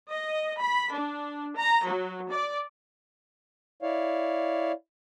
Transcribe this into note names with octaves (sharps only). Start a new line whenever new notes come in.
D#5
B5
D4
A#5
F#3
D5
E4 C#5 D5 F5